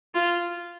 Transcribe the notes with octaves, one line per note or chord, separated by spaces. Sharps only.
F4